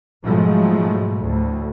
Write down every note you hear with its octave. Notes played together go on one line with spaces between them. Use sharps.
G#2 B2 F3 F#3 G#3 A3
D2 A2